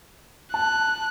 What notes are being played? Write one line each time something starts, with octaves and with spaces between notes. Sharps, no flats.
A5 F#6